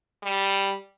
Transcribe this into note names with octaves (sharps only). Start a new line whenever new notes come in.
G3